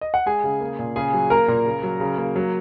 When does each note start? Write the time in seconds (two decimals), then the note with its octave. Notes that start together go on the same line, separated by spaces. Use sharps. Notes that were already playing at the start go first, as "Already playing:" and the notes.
0.01 D#5
0.14 F#5
0.26 G#3 G#4 G#5
0.44 C#3
0.61 A#3
0.79 A#2
0.96 C#3 G#4 G#5
1.13 F#3
1.30 A#3 A#4 A#5
1.48 A#2
1.66 C#3
1.83 F#3
2.00 C#3
2.18 A#3
2.36 F#3